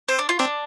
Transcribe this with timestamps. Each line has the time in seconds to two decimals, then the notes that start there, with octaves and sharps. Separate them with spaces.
0.08 C4 C5
0.19 D4
0.29 F4
0.39 C4 D4